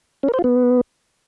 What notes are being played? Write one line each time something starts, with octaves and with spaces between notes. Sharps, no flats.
C#4
A#4
C5
F4
B3